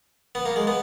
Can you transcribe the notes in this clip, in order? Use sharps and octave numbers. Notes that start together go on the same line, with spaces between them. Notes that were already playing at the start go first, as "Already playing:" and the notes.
B3
A#3
G#3
B3